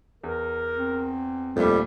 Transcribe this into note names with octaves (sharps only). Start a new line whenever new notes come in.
E2 A#4
C4
D#1 F2 A#2 G3 A3